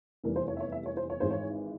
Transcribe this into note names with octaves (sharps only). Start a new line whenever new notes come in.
F1 E2 E3 G3 A#4
C5
C#5
E5
C#5
E5
C#5
C5
C#5
G#1 G#2 E3 G#3 C5
C#5